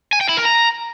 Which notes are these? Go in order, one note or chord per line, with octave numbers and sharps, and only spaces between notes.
G#5
G5
E4
A#4
A#5